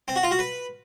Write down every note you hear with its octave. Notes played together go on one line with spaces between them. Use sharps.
C4
F#4
F4
F#4
B4